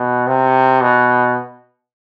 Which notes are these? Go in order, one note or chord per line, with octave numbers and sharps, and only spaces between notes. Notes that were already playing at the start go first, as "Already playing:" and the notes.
Already playing: B2
C3
B2